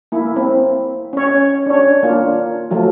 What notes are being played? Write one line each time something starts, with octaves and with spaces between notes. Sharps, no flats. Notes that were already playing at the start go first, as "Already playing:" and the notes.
A#3 E4
C4
C#4 C#5
D4 C#5
A#3 D4 F4
F3 F#3 A3 F4